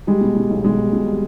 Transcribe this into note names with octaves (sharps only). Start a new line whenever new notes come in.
G3 G#3
B2
B2 G3
B1
B1 G#3
G3
B2
G3